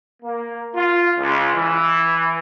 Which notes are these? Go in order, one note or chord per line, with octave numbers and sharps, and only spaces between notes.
A#3
F4
C#2
E3